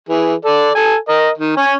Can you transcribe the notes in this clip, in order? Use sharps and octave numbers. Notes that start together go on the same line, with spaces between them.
E3 G#4
A4 D5
A4 G#5
A#4 D#5
D#3
C#4 G#5